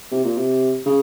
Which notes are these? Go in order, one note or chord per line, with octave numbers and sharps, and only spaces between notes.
C3
A#2
C3
C#3